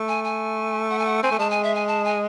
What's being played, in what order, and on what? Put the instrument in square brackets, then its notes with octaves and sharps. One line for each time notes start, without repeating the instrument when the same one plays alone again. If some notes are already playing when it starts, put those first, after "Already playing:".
Already playing: [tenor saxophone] A3
[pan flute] G#5
G#5
F#5
G#5
F#5
[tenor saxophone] C4 [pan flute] G#5
[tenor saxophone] A3
[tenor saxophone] G#3 [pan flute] A5
[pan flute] G#5
E5
G#5
A5
G#5